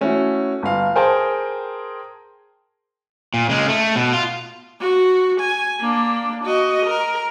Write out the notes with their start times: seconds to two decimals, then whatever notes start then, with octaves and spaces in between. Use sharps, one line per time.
0.01 A3 C#4 E4 F#4
0.63 G1 F5
0.96 G#4 A#4 C5 G5 A5
3.34 A#2
3.49 C#3 G#3
3.68 A3
3.96 B2
4.13 F4
4.80 F#4
5.40 G#5
5.80 A#3 D4
6.44 F#4 D#5
6.85 A#4